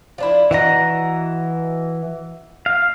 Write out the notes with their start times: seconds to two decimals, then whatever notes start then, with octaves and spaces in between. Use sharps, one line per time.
0.18 F3 D4 E4
0.51 E3 F#4 D#5 F#5 A#5
2.66 F5